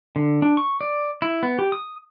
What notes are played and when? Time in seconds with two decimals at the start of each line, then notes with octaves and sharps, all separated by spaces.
0.16 D3
0.42 D4
0.57 C#6
0.81 D5
1.22 E4
1.43 B3
1.59 G4
1.72 D#6